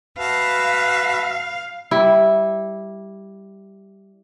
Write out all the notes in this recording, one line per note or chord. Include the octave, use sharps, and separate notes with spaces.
F#4 B4 E5 F5 A5
G3 E4